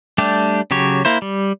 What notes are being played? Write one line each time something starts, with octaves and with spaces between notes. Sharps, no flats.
G3 A3 D4 G4
C#3 F#3 G4 C#5
A#3 E4 C5
G3